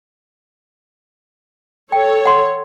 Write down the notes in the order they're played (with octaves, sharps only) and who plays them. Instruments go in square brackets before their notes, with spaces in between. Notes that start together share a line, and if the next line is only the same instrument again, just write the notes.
[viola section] A4 C#5 [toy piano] G5
[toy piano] F#5 C6